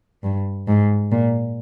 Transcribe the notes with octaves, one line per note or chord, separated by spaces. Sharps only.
G2
G#2
A#2